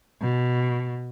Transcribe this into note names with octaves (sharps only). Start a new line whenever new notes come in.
B2